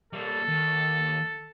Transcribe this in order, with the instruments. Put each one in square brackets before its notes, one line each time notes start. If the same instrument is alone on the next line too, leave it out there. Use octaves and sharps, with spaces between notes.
[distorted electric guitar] G3 A#3 [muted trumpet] A4
[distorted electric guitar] D#2